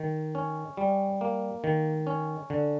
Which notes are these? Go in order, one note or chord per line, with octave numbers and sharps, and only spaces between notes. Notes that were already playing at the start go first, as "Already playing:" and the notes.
Already playing: D#3
C#4
G3
A#3
D#3
C#4
D3